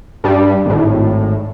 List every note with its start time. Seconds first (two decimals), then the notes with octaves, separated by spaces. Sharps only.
0.24 G2 G3
0.66 G#1 A2